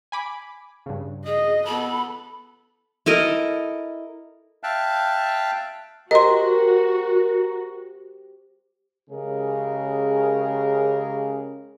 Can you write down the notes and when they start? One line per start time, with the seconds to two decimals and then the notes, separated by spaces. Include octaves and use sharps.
0.12 G#5 B5 D6
0.86 G2 C#3
1.26 G#4 D#5
1.66 B3 A4 B5
3.06 E4 A4 A#4 D#5
4.63 E5 F5 G5 A5 F#6
6.11 F#4 G4 A#4 C5 D#5 C6
9.10 C#3 G#3 C#4 G4 G#4 A#4